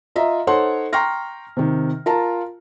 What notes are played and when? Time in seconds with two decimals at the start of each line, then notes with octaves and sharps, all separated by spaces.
0.16 F4 D#5 E5 A#5
0.47 D#4 A4 C5 C#5 F#5 C6
0.93 G5 A#5 C6 C#6 F6 A#6
1.57 C3 D#3
2.06 F4 A#4 A5 A#5